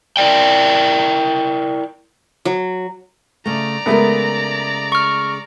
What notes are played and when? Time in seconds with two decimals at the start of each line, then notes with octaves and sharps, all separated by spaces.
0.17 E4 A#4 D5 G5
2.45 F#3
3.46 C#3 A3 D5 A#5
3.86 C#3 G#3 A3 B3 A#4
4.92 C#6 F6